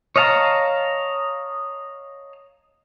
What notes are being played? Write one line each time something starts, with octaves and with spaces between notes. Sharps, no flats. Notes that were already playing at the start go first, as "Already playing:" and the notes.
C#5 D#5 F5 A5 A#5